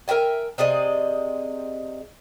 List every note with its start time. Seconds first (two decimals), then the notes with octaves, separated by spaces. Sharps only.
0.08 A#4 E5 G5 G#5
0.58 C3 G#4 D5 D#5